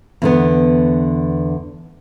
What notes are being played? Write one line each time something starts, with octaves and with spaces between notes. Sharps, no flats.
E2 D3 B3